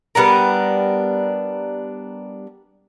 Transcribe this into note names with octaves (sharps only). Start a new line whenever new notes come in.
G3 B3 D4 A#4